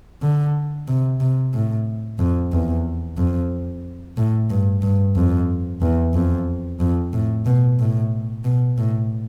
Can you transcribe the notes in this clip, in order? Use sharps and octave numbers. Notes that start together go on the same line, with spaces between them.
D3
C3
C3
A2
F2
E2
F2
A2
G2
G2
F2
E2
F2
F2
A2
B2
A2
B2
A2